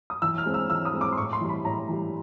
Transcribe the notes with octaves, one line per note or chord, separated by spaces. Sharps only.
D#6
E3 E6
F6
G#3 C4
E6
E3 E6
D#6
G#3 C4
D6
C6
A2 C#6
C6
E3 G3
B5
A2 A#5
E3 G3